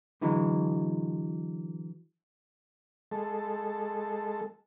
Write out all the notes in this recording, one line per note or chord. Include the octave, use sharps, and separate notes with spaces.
D3 E3 F#3 G#3
G#3 A4